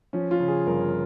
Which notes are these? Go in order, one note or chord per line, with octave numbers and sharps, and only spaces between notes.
F3 C#4
F4
C#3
G#4
G1 A#4